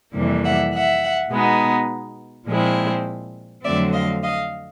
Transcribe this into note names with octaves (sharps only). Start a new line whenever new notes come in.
F2 C3 E3 G3 A#3
E5 F#5
E5 F#5
B2 G#3 B3 D#4
A#2 F3 G#3 C4 E4
F2 D3 F#3 A3 C4 D5 E5
D#5 F5
D#5 F5